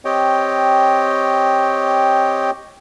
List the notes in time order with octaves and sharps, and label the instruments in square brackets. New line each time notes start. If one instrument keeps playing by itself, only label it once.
[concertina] C4 G4 C#5 D#5 G5